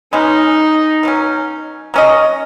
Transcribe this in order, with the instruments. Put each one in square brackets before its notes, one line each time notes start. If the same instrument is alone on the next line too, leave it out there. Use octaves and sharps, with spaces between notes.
[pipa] B2 G#3 C#4 [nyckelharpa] D#4
[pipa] B2 F#3 C#4
F#3 C#4 F#4 D#5